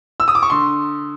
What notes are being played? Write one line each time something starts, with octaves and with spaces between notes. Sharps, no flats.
E6
D#6
D6
C#6
D3 C6